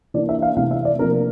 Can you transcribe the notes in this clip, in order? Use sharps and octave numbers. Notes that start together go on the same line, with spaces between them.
E3 A#3 D4 D5
E5
F5
C3 E3 A3 F5
E5
D5
C3 F3 A#3 D4 A#4